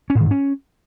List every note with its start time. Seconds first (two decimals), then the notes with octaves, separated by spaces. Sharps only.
0.10 C#4
0.15 A2
0.20 D#3
0.26 G#2
0.31 C#4